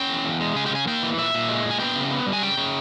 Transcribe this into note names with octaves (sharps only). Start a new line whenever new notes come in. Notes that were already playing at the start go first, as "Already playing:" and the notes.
Already playing: C#4 G5
E2
E2
G#3
C#3 G#5
G5
C#3 G#5
A#3 G5
E3
A#2 E5
A#2
G#3
A#2
G#5
B3 G5
C#3
B3
G3
G#5
C#3 G5
C#3